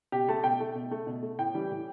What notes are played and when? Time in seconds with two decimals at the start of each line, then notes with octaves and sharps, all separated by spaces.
0.12 B2 G4
0.28 A3 A5
0.44 B2 G5
0.60 A3
0.75 B2
0.91 A3
1.07 B2
1.22 A3
1.39 A2 G5
1.54 E3 G3
1.71 A2